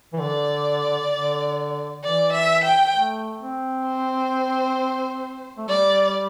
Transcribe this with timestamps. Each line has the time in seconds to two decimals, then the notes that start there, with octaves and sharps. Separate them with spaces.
0.13 E3
0.20 D3 D5
1.11 D3
2.03 E3 D5
2.33 E5
2.64 G5
2.94 A3
3.40 C4
3.86 C5
5.58 A3
5.68 G3 D5